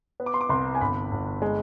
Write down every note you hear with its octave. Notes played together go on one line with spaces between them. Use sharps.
B3
D6
C6
D6
C2 C6
G#5
G1 B5
G1
G#3